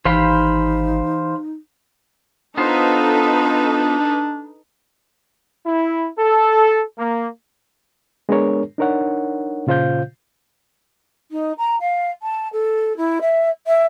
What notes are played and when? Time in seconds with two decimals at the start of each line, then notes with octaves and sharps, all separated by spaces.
0.05 G#1 E3 D#4 G4 C5 F5 B5
2.57 B3 D4 D#4 F4 A4 B4 C5
5.65 E4
6.18 A4
6.99 A#3
8.29 G#3 B3 D4 G#4 A#4 C#5
8.78 D4 D#4 A#4 C#5 F#5
9.67 A#2 C#3 F4 C5 F5 G6
11.31 D#4
11.57 A#5
11.80 F5
12.22 A5
12.52 A4
12.96 E4
13.21 E5
13.66 E5